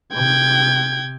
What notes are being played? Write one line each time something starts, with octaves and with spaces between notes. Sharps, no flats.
C3 G5 G#6